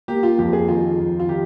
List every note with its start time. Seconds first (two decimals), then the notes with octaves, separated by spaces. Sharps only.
0.08 A#3 G4
0.23 F4
0.38 F2 G4
0.53 G#4
0.68 D#3 F4
0.99 F2
1.19 F4
1.29 D#3 G4